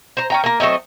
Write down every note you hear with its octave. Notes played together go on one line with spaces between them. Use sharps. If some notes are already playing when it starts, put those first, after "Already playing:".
C5 A#5
C#4 G5 A#5
A#3 A#4
F#3 A3 C4 D#5